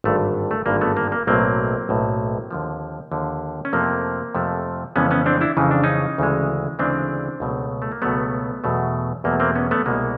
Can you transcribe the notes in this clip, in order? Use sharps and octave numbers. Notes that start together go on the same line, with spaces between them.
G#1 G2 D3 A3
A3
G#1 G2 D3 A#3
A3 B3
A#3
A#3
B1 A2 F#3 A#3 C4
B1 A2 F#3
D#2 D3 F3
D#2 D3 F3
C#4
F2 C3 F3 A3 A#3 C4
F2 C3 F3 A3
F2 C#3 E3 G#3 B3 C#4
B3 C#4
C4 D4
D4 E4
F2 C#3 E3 G#3 D#4
D4
C#4 D#4
D2 C#3 E3 G#3
D2 C#3 E3 G#3 C4 D4
C#2 B2 F#3 A3
A3
A#3
C#2 B2 F#3 A3 B3
E2 B2 F#3 A3
E2 B2 F#3 A3 A#3
A#3 C4
B3 C#4
A3 B3
C2 B2 G#3 A#3